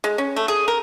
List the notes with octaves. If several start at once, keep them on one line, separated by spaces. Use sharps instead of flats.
G#3
C#4
A3
G#4
A#4